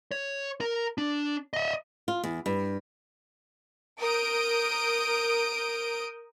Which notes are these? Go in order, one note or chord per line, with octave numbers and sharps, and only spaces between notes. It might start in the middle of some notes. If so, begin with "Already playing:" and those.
C#5
A#4
D4
D#5 E5
F4
E2
G2
A#4 D#6 G6 D7